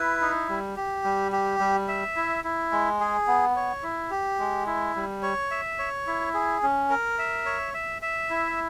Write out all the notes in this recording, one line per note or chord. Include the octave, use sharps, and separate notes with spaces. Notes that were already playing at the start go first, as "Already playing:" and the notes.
Already playing: E4 B4
D#4
G3
G4
G3
G4
G3
E5
E4
E4
G#3
G#4
B3
C#5
E4
G4
G#3
E4
G3
C#5
E5
C#5
E4
G#4
C#4
A#4
E5
C#5
E5
E5
E4